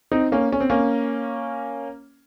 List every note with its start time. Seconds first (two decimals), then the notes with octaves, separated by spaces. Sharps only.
0.12 C4 D#4
0.32 A#3 C#4
0.52 C#4
0.60 C4
0.70 A#3 C#4